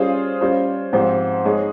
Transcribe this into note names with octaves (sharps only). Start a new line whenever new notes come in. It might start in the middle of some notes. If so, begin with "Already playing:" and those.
Already playing: G3 C#4 F4 G#4 C5
G3 C#4 F4 C5
G#2 F3 C4 G4 C5
G#3 D#4 G#4 C#5